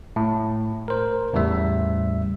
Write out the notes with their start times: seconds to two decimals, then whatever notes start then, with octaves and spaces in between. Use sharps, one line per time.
0.16 A2
0.88 A#4 C5
1.33 E2 A2 C#3 G3 E5